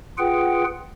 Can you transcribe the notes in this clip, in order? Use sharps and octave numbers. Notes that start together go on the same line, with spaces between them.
F4 G#4 B4 F#5 G5